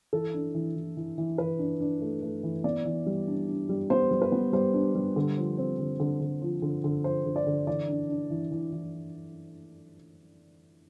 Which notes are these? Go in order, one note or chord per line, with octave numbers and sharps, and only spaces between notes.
E3 A4
D4
E3
E3
E3
E3
E3 B4
D4
D4
A3
A3
E3
B3 D5
E3
G3
D4
D4
G3
B3 C5
G3
B4
B3
G3 C5
D4
G3
D3
F3
C4
D3
D3
D3
F3
D3
D3
F3 C5
D3
D5
D3
E3 D5
D4
D4
E3
E3
E3